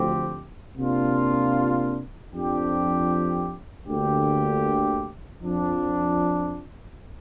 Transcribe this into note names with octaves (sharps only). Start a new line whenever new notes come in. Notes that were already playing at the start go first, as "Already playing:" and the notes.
Already playing: D2 D3 F3 C4 G4
C3 A#3 D4 F4
F2 F3 D4 G4
D2 D3 A#3 G4
F2 F3 D4